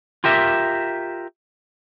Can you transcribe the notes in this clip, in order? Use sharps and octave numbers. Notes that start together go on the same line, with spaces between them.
F4 G4 A#4 E5